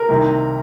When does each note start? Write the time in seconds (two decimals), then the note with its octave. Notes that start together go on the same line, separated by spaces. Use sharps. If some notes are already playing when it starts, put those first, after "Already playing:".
Already playing: A#4
0.09 C2 C3 D#3 A#3